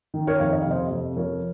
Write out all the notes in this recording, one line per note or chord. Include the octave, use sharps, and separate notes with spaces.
D#3
A#4 C#5
F2 C#5 F5
D#5
C3 F5
C5 D#5
F2
F3 A#4 C#5